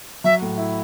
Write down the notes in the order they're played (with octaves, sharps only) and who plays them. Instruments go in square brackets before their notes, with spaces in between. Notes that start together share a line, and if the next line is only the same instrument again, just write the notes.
[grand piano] F#3 [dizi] E5
[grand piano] A2
E4